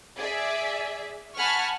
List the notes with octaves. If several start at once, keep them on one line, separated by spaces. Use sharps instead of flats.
G#4 D5 E5
F#5 G#5 A5 B5 C#6 F6